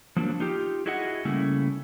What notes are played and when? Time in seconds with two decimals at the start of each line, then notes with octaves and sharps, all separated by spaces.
0.16 F3 F#3 A#3 D4
0.40 D#4 F4 G4
0.86 E4 F#4 G#4 D#5 E5 F#5
1.25 C#3 G3 A3 A#3 C#4 E4